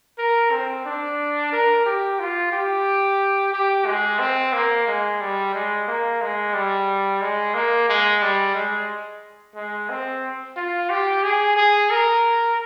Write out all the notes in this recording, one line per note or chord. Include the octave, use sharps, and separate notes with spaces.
A#4
C4
D4
A#4
G4
F4
G4
G4
G#3
C4
A#3
G#3
G3
G#3
A#3
G#3
G3
G#3
A#3
G#3
G3
G#3
G#3
C4
F4
G4
G#4
G#4
A#4